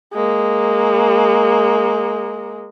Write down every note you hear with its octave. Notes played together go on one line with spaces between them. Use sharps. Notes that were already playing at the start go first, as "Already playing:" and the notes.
G#3 A#3